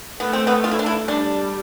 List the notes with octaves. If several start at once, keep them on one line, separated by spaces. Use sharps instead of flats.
A3 B3
C4
B3
F4
E4
D4
E4
G3 D4